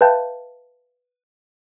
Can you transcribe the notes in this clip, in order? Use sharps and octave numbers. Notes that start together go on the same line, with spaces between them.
B4 E5 F5 G5 A5 G6